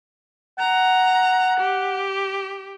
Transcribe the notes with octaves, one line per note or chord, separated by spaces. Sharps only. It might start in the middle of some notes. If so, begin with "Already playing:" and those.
F#5 A#5
G4